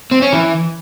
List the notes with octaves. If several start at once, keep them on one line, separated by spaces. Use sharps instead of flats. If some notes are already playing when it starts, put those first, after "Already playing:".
C4
C#4
E3